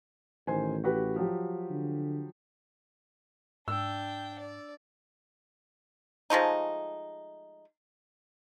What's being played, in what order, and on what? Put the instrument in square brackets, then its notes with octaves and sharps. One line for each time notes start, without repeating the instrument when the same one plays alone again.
[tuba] A1 [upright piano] D#3 C5 G#5
[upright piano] F#4 G4 B4
F3 F#3 G4
[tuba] D3
[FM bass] G#2 [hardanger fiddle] D4 G5 [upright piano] E6
[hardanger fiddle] D5
[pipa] F3 G#3 A3 D#4